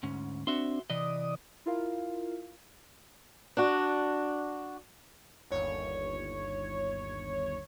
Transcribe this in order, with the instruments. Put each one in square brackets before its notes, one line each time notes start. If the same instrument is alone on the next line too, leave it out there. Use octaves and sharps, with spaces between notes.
[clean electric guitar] D2 G#2 C#4
[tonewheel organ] C4 D4 [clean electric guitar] F#4 E5 C6
[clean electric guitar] C3 E3 D#5 [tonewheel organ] D5 D#6
[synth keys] E4 F4 A#4 F5
[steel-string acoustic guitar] D4 F#4
[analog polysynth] G1 D#2 C#5